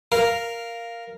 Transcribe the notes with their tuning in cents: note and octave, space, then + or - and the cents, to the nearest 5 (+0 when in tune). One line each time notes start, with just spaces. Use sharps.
A#4 +0 F5 -5